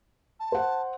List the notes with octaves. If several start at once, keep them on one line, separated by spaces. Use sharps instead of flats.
A5
C5 F#5